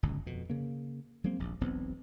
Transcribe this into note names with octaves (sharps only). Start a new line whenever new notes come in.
D1 G1 C#2
F2 B2
C#3 A#3
F#3 G#3 A#3 C4
D#1 A#1
E1 B1 B3 C4